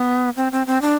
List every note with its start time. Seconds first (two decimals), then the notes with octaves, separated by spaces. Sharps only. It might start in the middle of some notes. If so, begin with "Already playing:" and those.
Already playing: B3
0.36 C4
0.52 C4
0.67 C4
0.81 D4